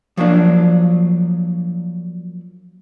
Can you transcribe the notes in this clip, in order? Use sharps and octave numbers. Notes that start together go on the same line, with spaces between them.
F3 F#3 A#3 D4